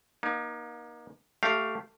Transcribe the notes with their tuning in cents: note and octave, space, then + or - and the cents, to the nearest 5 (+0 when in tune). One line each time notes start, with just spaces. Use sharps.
A#3 +35 D#4 +0
A3 +10 G4 -15 F5 +0